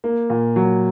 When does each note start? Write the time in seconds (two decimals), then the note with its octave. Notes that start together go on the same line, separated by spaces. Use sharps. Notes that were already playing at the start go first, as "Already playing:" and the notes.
0.04 A#3
0.30 A#2
0.56 F#3